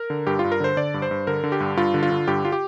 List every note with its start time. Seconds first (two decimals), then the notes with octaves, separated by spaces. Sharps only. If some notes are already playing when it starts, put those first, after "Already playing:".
Already playing: A#4
0.10 D3
0.27 G2 G4
0.39 F4
0.44 G2
0.52 A#4
0.60 D3 C5
0.77 D3 D5
0.94 G2
1.02 C5
1.11 G2
1.27 D3 A#4
1.44 D3
1.52 G4
1.60 G2
1.77 G2 F4
1.94 D3
2.03 F4
2.11 D3
2.27 G2 G4
2.45 F4
2.52 G4